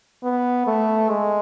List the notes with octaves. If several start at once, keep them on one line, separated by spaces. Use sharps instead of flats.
B3
A3
G#3